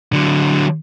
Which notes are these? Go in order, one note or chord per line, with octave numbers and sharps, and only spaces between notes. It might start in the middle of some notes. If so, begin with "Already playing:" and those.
D3 F#3